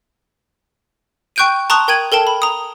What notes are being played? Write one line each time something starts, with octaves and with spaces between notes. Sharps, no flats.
G5 C#6 F#6 G6 D7 D#7
A5 A#5 C6 C#6 D#6 F#6
A#4 G5 G#6 D#7 F#7
A4 A#4 G5 A5
B5
A#5 D#6